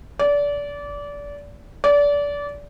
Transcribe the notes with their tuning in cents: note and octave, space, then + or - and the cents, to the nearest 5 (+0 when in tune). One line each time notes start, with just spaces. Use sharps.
D5 -25
D5 -25